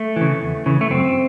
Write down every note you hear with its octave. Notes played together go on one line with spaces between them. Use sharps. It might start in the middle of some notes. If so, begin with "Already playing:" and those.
Already playing: A3
C#3 E3
E2
C#3 E3
A3
F#2 C4